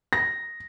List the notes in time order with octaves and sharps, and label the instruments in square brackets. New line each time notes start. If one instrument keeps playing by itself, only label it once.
[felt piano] A#6